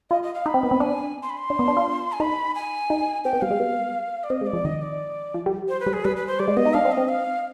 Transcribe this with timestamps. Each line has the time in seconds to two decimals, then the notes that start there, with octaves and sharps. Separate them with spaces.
0.10 F4 D#5
0.23 D#5
0.34 F5
0.46 D#4 B5
0.54 C4
0.63 B3
0.71 C4
0.80 D4 G#5
1.23 C6
1.30 B5
1.37 C6
1.50 D4
1.59 B3
1.68 D4
1.77 F4
2.12 G#5
2.20 D#4 B5
2.55 G#5
2.90 D#4
3.25 C4 G5
3.33 B3
3.42 G3 F5
3.51 G#3
3.60 B3
4.24 D5
4.30 C4 D#5
4.41 G#3
4.47 D5
4.53 F3
4.65 D#3 D#5
4.82 D5
5.34 F3
5.46 G3
5.69 C5
5.80 B4
5.86 G3
5.93 G#4
6.05 G3 B4
6.17 B4
6.27 C5
6.39 G3 D5
6.48 G#3
6.57 B3 D#5
6.65 D#4
6.74 D4 F5
6.85 C4
6.92 D#5
6.97 C4
7.09 F5